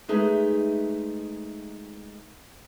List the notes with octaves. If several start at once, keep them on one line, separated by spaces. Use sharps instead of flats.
G#3 A3 D#4 G#4 B4 E5